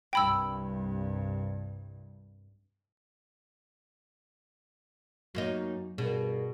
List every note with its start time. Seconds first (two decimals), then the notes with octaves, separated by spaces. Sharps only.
0.13 C2 G2 G5 B5 E6
5.35 F#2 F#3 A#3 D#4
5.98 G2 B2 G#4 A#4